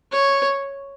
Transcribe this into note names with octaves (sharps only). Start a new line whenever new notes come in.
C#5